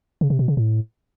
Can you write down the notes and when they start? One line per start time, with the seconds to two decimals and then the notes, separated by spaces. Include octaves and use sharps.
0.21 C#3
0.30 C3
0.39 B2
0.48 C#3
0.57 A2